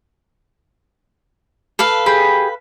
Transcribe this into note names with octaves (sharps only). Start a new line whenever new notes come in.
A4 B4 F5
G4 G#4 B5